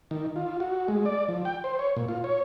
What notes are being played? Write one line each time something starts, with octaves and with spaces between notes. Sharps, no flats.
D#3
F4
F#4
G#3
D5
F3
G5
C5
C#5
A#2
F4
C#5